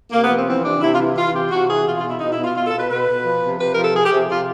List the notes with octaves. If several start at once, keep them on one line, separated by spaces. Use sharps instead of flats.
C3 A#3
B3
F3
C4
E3 C4
C3 D4
C3 E4
F4
E3
E3 F4
C3 G4
C3 F#4
E3 G#4
B2 F4
F4
B2
E4
B2 D#4
B2 E4
F4
B2 F4
A4
B2
B4
B2 B4
B2
F3
C3
C3 B4
A#4
F3
A4
F3 G#4
G4
C3
C3 F4